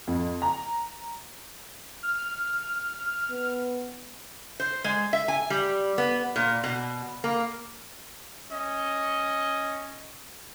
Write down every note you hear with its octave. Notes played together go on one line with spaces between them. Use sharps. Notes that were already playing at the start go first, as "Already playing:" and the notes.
F2
A#5
F6
B3
C5
G#3
E5
G#5
G3
B3
A#2
B2
A#3
C#4 D#5